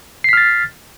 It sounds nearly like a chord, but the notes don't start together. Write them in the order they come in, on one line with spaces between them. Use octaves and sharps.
C7 B6 F6 A6